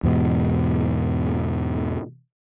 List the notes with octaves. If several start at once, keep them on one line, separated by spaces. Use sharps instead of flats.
E2 G#2 B2